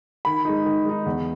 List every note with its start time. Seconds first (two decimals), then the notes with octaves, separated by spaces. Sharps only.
0.25 D#3 B5
0.45 G#3 D#4
0.65 D#3
0.85 G#3 D#4
1.06 E2